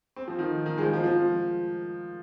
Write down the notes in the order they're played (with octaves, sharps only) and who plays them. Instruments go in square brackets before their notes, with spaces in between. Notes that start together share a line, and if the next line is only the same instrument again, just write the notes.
[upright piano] C4
F3
D#3
D#3
G#3
F3
F3
F3